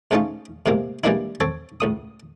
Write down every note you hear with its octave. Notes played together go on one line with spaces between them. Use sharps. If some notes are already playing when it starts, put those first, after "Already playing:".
G#2 G#3 A3 C#4 D#4 F4
A2 C3 G#3 A#3
E3 G3 G#3 A#3 D4 E4
C4 A4 C#5
C#2 A2 D#6